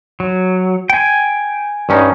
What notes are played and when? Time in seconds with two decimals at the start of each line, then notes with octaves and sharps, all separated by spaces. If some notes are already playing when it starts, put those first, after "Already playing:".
0.20 F#3
0.90 G5 G#5
1.89 G2 C#4 D#4